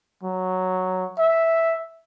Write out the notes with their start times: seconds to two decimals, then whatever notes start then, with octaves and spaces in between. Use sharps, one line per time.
0.23 F#3
1.18 E5